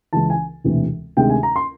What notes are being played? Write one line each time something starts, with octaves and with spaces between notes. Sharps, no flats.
C#2 C#3 E3 A5
G#5
E1 D2 C3 E3
D2 C3 D#3 G#3 G5
G#5
A#5
C6